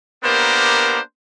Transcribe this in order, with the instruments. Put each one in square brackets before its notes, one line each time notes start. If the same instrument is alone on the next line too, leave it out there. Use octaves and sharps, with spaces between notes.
[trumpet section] A#3 B3 D4 G4 A#4 C5